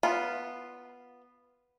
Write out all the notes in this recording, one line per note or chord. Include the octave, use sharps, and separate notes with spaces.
B3 F4